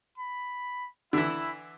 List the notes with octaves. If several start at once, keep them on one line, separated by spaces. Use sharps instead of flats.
B5
D3 E3 E4